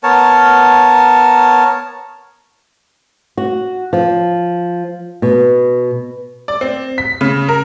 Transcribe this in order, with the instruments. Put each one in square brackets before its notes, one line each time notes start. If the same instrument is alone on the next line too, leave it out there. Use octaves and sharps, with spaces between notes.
[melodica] B3 A#4 C#5 A5
[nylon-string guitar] F#4
F3
B2
[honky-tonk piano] D5
C4
B6
C#3
A#4